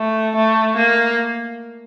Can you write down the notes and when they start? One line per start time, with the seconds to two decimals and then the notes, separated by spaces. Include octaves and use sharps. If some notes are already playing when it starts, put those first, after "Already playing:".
Already playing: A3
0.36 A3
0.77 A#3